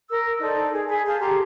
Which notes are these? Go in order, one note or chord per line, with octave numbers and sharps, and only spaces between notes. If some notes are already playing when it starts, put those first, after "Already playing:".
A#4 E6
D#4 A4 C5 D5
G#4
G#4 G#5 B5
G#4 F5 A5 G6
G4 A4 A#5 C6